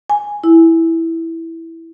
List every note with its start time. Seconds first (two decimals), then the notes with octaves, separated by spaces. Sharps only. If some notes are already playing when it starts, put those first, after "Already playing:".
0.10 G#5
0.44 E4